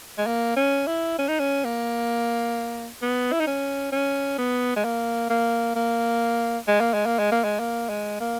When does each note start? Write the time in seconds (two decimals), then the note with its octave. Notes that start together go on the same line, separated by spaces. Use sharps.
0.18 G#3
0.26 A#3
0.56 C#4
0.87 E4
1.19 C#4
1.28 D#4
1.39 C#4
1.64 A#3
3.02 B3
3.32 E4
3.40 D#4
3.47 C#4
3.92 C#4
4.38 B3
4.76 G#3
4.84 A#3
5.30 A#3
5.76 A#3
6.68 G#3
6.80 A#3
6.94 G#3
7.06 A#3
7.19 G#3
7.31 A#3
7.44 G#3
7.59 A#3
7.89 G#3
8.20 A#3